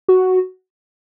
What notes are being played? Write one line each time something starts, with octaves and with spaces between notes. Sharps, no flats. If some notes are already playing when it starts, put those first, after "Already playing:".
F#4